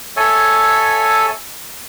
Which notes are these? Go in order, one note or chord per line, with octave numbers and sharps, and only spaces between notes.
A4 C#5 E5 G#5